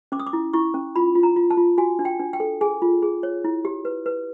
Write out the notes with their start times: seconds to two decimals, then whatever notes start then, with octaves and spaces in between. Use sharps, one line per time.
0.12 C#4 D6
0.20 D#6
0.27 D6
0.33 E4
0.53 E4 C#6
0.74 C#4
0.96 F4 B5
1.15 F4
1.23 A#5
1.36 F4
1.50 A5
1.57 F4
1.78 F#4 G#5
1.99 D4
2.05 G5
2.19 D4
2.33 G5
2.40 A4
2.61 G#4 G#5
2.82 F4
3.02 G#4
3.23 C#5
3.44 E4
3.65 G4
3.85 B4
4.06 B4